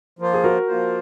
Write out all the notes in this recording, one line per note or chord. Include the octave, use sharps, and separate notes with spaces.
F3 A#3 F4 C5
G#4
F#4 A#4
F3 A#3 F4 C5